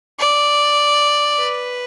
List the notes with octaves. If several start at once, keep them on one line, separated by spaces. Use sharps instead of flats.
D5
B4